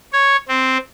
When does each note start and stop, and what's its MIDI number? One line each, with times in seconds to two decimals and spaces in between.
0.13 0.37 73
0.48 0.78 60